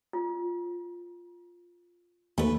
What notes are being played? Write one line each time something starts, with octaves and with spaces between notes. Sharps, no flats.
F4
D#2 A3 B4